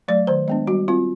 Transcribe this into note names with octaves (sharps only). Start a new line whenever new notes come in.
F#3 A3 D5
D#3 C5
G#3 B3 D4
G3 F#4
C4 F4